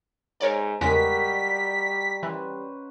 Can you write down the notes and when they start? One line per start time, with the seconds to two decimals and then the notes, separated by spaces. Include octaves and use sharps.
0.41 G#2 A#4 C#5 D5
0.81 E2 C#3 G3 G#3 F#4 A#4 D#5 B6
2.23 E3 C#4 B4 C5